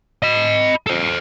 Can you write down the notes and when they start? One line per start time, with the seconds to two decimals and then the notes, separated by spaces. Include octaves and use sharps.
0.23 D#5 B5
0.87 A4 C5